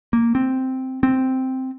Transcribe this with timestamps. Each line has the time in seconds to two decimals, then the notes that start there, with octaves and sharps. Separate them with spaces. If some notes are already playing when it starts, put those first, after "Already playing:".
0.13 A#3
0.35 C4
1.03 C4